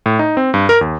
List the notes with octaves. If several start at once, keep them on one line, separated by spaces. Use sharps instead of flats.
A2
D#4
C4
G2
A#4
D#2